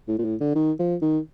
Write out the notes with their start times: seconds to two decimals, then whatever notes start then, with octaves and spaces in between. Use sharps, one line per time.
0.08 A2
0.19 A#2
0.25 A2
0.40 D3
0.56 D#3
0.79 F3
1.02 D#3